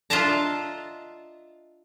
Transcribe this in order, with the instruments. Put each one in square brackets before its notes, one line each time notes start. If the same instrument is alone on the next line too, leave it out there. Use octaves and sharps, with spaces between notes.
[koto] D4 F4 D#5 E5 A5 A#5